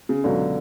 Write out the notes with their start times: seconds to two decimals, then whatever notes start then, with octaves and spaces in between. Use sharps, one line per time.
0.09 C#3
0.24 C#2 B2 D3 F#3